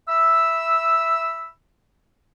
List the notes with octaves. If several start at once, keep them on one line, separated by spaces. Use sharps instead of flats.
E5 B5 E6